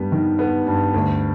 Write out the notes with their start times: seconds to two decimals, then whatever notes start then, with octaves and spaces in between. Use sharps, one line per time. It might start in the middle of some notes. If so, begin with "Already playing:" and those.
Already playing: G2 G3 B3
0.12 D#3
0.39 B3
0.66 G2
0.94 D2